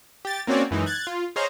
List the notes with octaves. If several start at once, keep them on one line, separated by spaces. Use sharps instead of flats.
G4 A6
A#3 C4 C#4 F#4 C#5 D5
F#2 E3 G#3 D#4
F#6 G#6 A6
F4
G#4 C5 C#5 D#5 F5 A#5